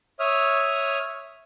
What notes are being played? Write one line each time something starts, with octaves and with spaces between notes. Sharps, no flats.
C#5 E5 D#6 F6